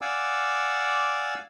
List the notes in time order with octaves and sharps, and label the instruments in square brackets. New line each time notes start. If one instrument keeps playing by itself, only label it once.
[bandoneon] D5 F5 F#5 G#5 D6 E6